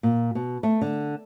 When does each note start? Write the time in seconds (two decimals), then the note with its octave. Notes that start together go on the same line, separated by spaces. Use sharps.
0.03 A#2
0.35 B2
0.63 A3
0.81 D3